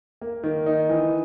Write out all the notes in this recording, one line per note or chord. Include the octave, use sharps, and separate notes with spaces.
A#3
D#3
D#4
E3